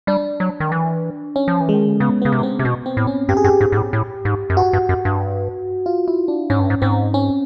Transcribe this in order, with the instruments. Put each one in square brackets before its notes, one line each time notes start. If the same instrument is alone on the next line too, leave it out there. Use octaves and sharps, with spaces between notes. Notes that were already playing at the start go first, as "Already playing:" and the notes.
[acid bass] G3 [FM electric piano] D4
[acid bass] F#3
D#3
E3
[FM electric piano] C#4
[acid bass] F3
E3
[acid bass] D#3 [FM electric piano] G#3
[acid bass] D3
[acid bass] C#3 [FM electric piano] B3
[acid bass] C#3 [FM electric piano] B3
[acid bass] C3
[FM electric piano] B3
C4
[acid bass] C3
[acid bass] B2 [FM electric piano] B3
[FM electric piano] C4
[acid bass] A2
[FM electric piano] C#4
[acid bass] G2 [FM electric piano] G4
[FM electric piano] G#4
[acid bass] G2 [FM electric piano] G4
[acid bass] G#2
G#2
A2
A2
G#2
F#2
[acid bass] G2 [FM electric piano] F#4
[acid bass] G2
F#2
G2
[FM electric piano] F4
E4
D4
[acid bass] G#2 [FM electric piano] C#4
[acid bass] G2
G#2
[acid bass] G#2 [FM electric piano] C4
[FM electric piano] C#4